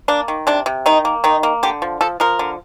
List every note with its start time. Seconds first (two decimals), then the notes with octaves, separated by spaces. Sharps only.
0.08 A#3 D4
0.28 D#3
0.47 C3 D4
0.66 C3
0.86 D#3 D#4
1.05 A#3
1.24 D#3 D#4
1.43 A#3
1.63 D3 G4
1.82 F3
2.01 F3 A4
2.20 F3 A#4
2.39 D3